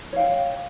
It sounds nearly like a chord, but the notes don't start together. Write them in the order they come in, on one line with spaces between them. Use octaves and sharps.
C#5 F5 G5